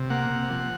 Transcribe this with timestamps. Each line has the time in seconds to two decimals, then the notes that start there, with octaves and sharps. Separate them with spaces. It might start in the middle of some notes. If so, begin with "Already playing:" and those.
Already playing: C3
0.10 A#3 F#5
0.30 C3
0.50 F3